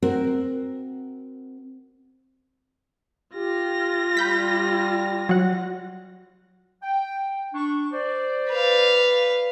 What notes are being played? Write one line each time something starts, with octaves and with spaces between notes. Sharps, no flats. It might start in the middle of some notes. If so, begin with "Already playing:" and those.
C4 F#4 A#4
F4 G4 A#6
G3 B5 G6 B6
F#3 F#5
G5
D4 C#6
C5 D5
B4 F5